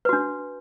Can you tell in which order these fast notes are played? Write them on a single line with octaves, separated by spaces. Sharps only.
B4 F#4 D4